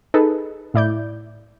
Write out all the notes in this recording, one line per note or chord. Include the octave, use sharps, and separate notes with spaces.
D#4 G#4 A4 B4
A2 E4 D5 G6